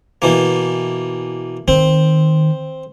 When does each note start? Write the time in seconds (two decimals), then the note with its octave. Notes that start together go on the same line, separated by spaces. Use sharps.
0.22 B2 E3 A#3
1.68 D#3 C4